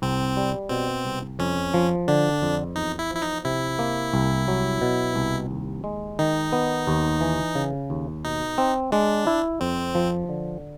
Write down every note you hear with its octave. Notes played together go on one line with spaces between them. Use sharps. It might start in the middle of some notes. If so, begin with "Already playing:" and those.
C2 C4
G3
B2 C4
C2
F2 C#4
F3
D3 D4
F2
E2 D#4
E4
F3 E4
D#4
C3 E4
A#3
C2
F#3
B2
C2
D#2
G#3
D#3 D#4
B3
D#2
E3
C#3
D#2
B2 D#4
C4
G#3 D4
E4
F2 C4
F3
D3